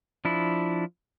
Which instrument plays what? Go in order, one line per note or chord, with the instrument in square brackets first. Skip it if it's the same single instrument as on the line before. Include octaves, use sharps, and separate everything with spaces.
[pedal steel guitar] F3 D4 E4